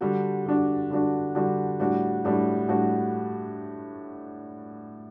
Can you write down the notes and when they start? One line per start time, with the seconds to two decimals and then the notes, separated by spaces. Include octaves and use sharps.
0.01 D3 G3 D4 F#4
0.46 D3 G3 D4 F#4
0.90 D3 G3 D4 F#4
1.35 D3 G3 D4 F#4
1.80 A2 G3 D4 F#4
2.24 A2 G3 D4 F#4
2.68 A2 G3 D4 F#4